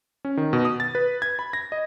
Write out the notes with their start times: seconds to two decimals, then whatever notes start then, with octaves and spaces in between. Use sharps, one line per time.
0.25 C#4
0.37 D#3
0.53 B2
0.65 D#6
0.80 A6
0.95 B4
1.22 G#6
1.39 B5
1.53 A#6
1.72 D#5